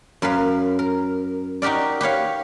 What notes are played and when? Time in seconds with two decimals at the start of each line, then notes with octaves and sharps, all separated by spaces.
0.22 F#2 A#4 B4 F5
0.79 A#4
1.62 D#4 F#4 G4 A#4 D5
2.01 G4 B4 C#5 F5